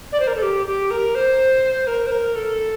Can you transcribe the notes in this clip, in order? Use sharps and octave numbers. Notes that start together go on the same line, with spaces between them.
D5
C5
A#4
A4
G4
G4
A#4
C5
A#4
C5
A#4
A4